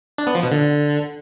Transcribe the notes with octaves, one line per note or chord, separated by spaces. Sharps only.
D4
B3
F3
B2
D3